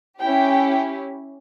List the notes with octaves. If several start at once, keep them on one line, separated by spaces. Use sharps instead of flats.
C#4 E4 G4 G5